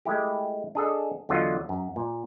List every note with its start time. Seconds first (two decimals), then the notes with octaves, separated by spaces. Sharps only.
0.05 G#3 A3 E4 G4
0.75 D4 G#4 A4 D#5
1.29 E2 D3 F#3 F4 D#5
1.69 F#2
1.96 A#2